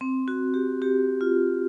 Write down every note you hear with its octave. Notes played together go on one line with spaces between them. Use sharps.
C4
F#4
G4
G4
F4